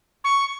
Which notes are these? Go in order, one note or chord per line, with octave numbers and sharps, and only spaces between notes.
C#6